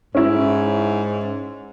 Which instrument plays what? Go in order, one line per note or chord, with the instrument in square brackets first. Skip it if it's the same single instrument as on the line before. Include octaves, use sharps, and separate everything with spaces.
[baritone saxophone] G#2 [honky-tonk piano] C#4 E4